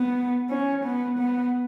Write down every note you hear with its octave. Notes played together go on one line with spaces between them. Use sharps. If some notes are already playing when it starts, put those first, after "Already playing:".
Already playing: B3
C#4
B3
B3